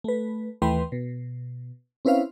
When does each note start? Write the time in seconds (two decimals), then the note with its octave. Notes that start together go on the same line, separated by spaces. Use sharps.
0.04 A3 B4
0.62 D#2 E3 A3 B4 G5 C6
0.92 B2
2.05 C4 C#4 E4 B4 C5 F5